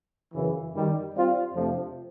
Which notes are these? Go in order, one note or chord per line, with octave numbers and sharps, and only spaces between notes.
F#2 C#3 E3
F#2 D#3 G3
G3 C4 F4
F2 C3 F3 A3 D4